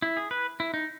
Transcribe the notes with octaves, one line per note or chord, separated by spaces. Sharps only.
E4
G#4
B4
E4
D#4